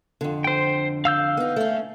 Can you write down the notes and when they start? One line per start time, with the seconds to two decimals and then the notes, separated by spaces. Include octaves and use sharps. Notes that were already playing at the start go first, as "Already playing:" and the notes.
0.21 F2 D3
0.44 C5 G5
1.05 F5 E6 G6
1.37 B3 D#4
1.56 A3 C#4